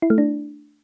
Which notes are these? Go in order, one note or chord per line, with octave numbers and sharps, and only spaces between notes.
E4
A3
D4